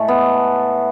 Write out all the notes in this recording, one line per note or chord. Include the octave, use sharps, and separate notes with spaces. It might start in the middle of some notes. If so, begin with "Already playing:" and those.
Already playing: A2 G#3 A3
B3